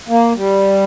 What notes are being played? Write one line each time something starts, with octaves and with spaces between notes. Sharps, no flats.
A#3
G3